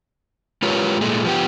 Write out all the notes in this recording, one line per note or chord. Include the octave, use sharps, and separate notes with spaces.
G#3 F4 G4 A#4 B4 C#5
A#2 G#3 A3
F3 B3 G4